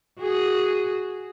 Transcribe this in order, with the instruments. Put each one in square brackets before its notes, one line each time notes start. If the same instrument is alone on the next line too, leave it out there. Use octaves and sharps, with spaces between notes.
[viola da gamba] F#4 G#4